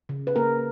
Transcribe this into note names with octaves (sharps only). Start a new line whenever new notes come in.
C#3
B4
A#3 A#4